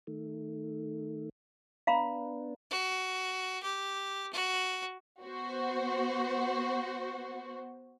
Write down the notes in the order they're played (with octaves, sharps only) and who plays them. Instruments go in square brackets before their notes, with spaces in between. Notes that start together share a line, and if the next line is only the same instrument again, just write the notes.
[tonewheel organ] D#3 A3
[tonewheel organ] B3 D4 [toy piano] F5 A#5 B5
[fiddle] F#4
G4
F#4
[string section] B3 F#4 C5